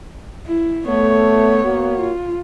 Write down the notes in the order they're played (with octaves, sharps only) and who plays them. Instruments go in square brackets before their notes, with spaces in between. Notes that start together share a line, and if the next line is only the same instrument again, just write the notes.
[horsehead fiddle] E4
[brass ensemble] A3 [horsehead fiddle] B3 C#5
[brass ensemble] A#3 F#4
[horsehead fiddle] F4